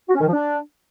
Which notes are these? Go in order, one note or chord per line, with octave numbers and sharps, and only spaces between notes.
F#4
C#4
D#3
F3
D4